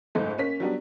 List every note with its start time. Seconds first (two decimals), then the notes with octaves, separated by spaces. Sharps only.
0.15 F#1 C#2 G#2 A3
0.38 A#3 C#4 B6
0.60 F#3 G3 B3 D4